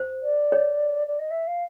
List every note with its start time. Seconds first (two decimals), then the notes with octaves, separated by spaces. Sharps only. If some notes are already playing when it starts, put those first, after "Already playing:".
Already playing: C5
0.22 D5
0.52 C#5
1.06 D5
1.18 D#5
1.30 E5
1.46 F5